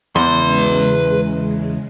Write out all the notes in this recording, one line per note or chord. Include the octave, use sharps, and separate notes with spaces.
E2 C#3 G#3 B4 C6